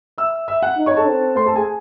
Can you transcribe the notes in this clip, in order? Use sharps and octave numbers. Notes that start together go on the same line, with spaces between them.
E5 E6
E5 E6
F#5 F#6
D#4
C#5 C#6
A4 A5
C4
A3 C5 C6
A4 A5
G#4 G#5